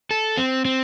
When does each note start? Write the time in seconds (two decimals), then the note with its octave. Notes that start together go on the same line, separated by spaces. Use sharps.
0.11 A4
0.37 C4
0.65 C4